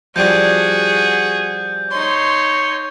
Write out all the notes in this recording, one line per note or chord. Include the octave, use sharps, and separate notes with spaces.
F3 G3 D4 F#4 G#4 G6
D#4 C#5 C6